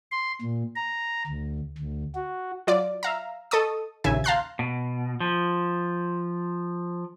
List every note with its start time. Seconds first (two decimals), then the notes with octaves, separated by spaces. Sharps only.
0.12 C6
0.42 A#2
0.76 A#5
1.27 D2
1.78 D2
2.15 F#4
2.67 F#3 F4 D5
3.03 E5 F5 A#5
3.51 A4 D#5 A5 C#6 D#6
4.04 A#1 D#2 C#3 E5 G#5
4.24 F5 A5 A#5 C6 F#6 G6
4.59 B2
5.20 F3